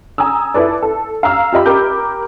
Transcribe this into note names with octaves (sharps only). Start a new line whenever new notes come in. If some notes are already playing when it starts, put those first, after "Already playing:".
G#5 A#5 D#6 E6
E4 A4 B4 D5
A4
F5 A#5 E6 F6
F4 G4 D#5 B5
G4 A#4 B5 D6 G6